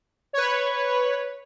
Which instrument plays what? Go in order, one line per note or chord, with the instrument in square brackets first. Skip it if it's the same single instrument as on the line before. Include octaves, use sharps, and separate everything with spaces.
[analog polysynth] B4 C#5